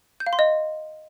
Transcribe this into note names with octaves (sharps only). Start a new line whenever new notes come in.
G6
F5
C6
D#5